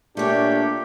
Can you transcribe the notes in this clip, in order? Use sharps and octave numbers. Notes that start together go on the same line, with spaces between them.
A#2 A3 D4 G4 C#5